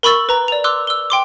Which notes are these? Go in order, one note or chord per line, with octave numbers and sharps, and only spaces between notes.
A#4 B5 C#6 E6 A6
B4 A#5
D5 F7
C6 D6 E6 F#6
E6 G7
G5 C6 D6